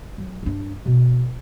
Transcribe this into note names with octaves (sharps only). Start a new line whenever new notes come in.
F#3
G2 D4
B2